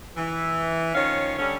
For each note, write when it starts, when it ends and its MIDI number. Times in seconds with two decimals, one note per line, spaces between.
0.17 0.92 52
0.95 1.36 51
0.95 1.36 53
0.95 1.36 61
0.95 1.36 73
0.95 1.36 77
1.38 1.55 50
1.38 1.55 55
1.38 1.55 61